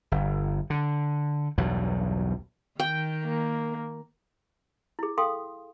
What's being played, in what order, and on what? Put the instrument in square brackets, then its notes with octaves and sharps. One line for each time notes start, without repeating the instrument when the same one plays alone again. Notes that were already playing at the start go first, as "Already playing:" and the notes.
[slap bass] G1
D3
B1 E2 G2 F#3
[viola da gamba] D#3 [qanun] G5
[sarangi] A#3
[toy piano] E4 G#4
A4 F5 G5 C6 D#6